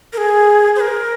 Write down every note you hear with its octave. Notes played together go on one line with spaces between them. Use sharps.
A#4
G#4
C5
A#4